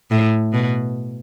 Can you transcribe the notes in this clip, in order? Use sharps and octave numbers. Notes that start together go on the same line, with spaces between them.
A2
B2